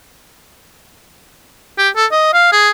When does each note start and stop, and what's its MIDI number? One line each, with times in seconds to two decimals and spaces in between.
1.78 1.89 67
1.96 2.06 69
2.11 2.31 75
2.33 2.49 77
2.52 2.70 68